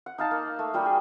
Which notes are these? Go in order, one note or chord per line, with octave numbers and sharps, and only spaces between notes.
F#5
D#4 F5 A5
A#3
A3
G3 A#3 F#4 G4
G#4